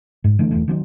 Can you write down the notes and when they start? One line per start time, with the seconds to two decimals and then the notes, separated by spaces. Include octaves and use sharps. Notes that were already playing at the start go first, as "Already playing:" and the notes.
0.24 G#2
0.39 D3 E3 A3
0.51 E1 C2 E3 A3
0.68 D#3 F#3 C4